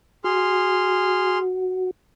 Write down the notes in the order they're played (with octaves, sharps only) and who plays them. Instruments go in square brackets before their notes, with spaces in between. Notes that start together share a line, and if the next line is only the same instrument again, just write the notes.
[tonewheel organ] F#4 [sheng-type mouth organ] G#4 C6 F6